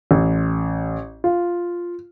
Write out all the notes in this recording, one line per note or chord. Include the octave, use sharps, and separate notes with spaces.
A1
F4